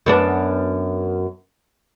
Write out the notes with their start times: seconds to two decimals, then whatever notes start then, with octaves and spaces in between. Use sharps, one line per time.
0.06 F#2 B3 D4